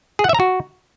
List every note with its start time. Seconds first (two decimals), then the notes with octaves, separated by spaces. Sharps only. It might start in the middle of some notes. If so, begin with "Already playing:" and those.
0.19 G#4
0.24 F#5
0.29 E5
0.35 A#5
0.40 F#4